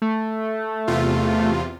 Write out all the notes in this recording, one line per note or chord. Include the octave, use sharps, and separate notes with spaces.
A3
E2 C3 F4